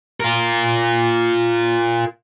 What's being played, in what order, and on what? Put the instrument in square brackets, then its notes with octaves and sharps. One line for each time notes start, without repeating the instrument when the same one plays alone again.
[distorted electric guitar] F4 A#4